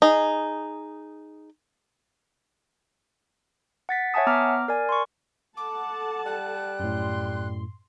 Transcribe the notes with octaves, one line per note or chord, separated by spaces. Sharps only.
D#4 G#4
F#5 A6 B6
C#5 E5 F#5 G#5 A5 D#6
B3 A#5 D6 F6
A#4 D5 G#5
C6 C#6
A4 F#5 A5 D6
G3 F#6
F#2 A2 C6